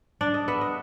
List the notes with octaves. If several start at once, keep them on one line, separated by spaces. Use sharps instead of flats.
D4 D5
D#5
B3 E5
D#5